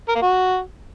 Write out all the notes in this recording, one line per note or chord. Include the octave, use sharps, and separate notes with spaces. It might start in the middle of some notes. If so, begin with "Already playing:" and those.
A#4
A#3
F#4